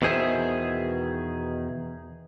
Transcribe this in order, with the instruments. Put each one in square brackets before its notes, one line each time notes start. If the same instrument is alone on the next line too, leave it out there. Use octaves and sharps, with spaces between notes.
[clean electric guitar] E2 B2 D#3 G#4 C5 E5